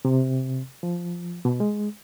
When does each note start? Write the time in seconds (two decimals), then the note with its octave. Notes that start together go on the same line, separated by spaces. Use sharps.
0.05 C3
0.83 F3
1.45 B2
1.60 G#3